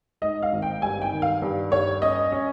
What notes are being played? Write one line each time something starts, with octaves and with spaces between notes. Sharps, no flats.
G#2 D#5
F5
G#1
G5
G2 G#5
G5
D#3
F5
G2
G2 C#5
C#4 D#5
C#4